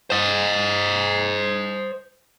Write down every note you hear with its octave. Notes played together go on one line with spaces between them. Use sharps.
C5 D#5